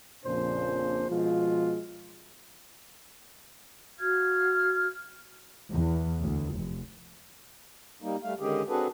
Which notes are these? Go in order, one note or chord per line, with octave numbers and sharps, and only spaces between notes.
A#1 F2 A#2 C#3 D4 C5
B2 F3 G#3 F4
F#4 F5 F6 G#6
E2
D2
F1
G3 A#3 D#4
G3 A3 F5
D3 D#3 G#3 C#4 G4 G#4
C4 D4 F#4 G#4 A4 B4